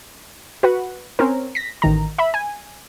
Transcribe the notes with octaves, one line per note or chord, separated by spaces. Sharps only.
F#4 B4 F#5
C4 C#4 A#4
A#6 B6
A1 D#3 A#5
E5 B5
G#5